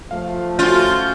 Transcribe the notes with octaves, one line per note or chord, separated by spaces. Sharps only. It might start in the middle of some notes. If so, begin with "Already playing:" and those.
F3 A3 F5
C#4 F4 F#4 G6